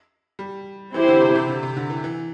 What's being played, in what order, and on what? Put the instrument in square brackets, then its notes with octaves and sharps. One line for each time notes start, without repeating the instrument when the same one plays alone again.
[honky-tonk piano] G3
[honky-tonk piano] E3 [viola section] C4 E4 G4 C5
[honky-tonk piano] D3
C3
C3
D3
C3
D3
E3
E3